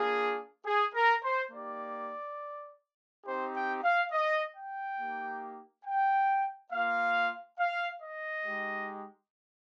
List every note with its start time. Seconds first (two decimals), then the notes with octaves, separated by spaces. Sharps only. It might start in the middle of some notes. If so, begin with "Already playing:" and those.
Already playing: A#3 D4 F4 G#4
0.66 G#4
0.95 A#4
1.24 C5
1.52 A#3 D#4 G4 D5
3.26 C4 D#4 G4 C5
3.54 G5
3.83 F5
4.12 D#5
4.55 G5
4.99 A#3 D#4 G4
5.85 G5
6.72 A#3 F4 F5
7.59 F5
8.01 D#5
8.45 G#3 D#4 G4